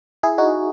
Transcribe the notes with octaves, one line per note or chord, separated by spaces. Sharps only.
E4 G#4
D#4 F#4